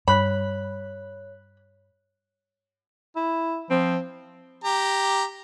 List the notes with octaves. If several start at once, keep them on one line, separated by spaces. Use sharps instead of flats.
G2 C#5 B5 F#6
E4
F3 C4
G4 A#5